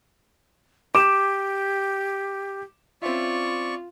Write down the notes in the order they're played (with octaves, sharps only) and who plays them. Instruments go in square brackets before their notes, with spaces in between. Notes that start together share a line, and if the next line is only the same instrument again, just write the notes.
[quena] G4 [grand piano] D6 E7
[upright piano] C4 C#4 E5 [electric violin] F4 [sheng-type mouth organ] D5 C#6